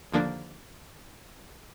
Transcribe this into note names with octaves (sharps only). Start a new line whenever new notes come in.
D#2 D3 F3 A#3 D4